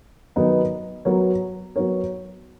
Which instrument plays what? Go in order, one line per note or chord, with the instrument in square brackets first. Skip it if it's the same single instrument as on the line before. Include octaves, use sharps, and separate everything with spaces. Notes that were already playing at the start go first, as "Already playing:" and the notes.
[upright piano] D#3 F#3 B3 D#4
F#3 B3 F#4 A#4 C#5
F#3 B3 F#4 A#4 C#5